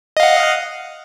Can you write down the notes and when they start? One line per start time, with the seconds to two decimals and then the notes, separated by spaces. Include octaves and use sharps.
0.17 D#5
0.20 F5
0.23 F#5